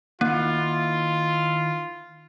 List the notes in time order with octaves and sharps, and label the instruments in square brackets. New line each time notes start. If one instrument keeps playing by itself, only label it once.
[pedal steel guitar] D#3 E4 [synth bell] A#3 [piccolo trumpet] F4